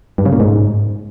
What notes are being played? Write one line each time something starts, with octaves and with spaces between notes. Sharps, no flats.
G2
C#3
A#2
G#2